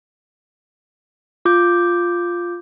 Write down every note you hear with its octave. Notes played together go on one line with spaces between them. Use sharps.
F4 D6 G6